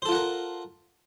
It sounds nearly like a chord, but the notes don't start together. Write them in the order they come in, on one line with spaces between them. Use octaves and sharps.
C5 A4 F4 F#5 A#4